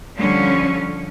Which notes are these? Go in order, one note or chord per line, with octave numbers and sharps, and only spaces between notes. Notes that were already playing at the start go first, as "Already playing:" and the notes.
D3 F3 G3 C#4